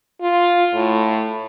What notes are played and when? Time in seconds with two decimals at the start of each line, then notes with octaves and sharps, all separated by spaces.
0.22 F4
0.74 A2